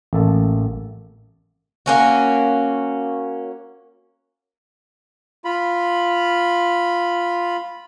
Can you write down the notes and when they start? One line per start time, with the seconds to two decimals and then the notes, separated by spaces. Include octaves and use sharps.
0.13 A1 A#3 A4 A5
1.86 A#3 C#4 F#4
5.45 F4 B5